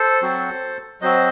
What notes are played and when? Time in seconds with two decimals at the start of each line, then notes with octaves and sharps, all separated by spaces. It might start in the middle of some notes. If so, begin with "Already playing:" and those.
Already playing: A4 C5
0.22 F#3 C4 F#4
1.01 F#3 C4 F#4 C5 D#5